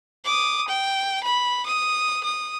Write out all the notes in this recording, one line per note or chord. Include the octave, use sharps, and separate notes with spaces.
D6 D#6
G5
B5
D#6
D#6